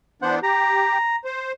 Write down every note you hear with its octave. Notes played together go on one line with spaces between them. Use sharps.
E3 B3 D4 C5 F#5
G4 A#5
C5